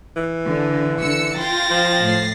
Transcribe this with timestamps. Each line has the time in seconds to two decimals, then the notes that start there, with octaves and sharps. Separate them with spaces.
0.17 E3
0.45 D3
1.01 D3 E6 C#7
1.39 F4 G5 C6 A6 A#6
1.70 F3
2.03 A2 C7